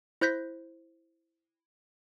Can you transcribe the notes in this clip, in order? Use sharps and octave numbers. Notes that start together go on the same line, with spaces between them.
E4 C5 F#6 G6 A#6 B6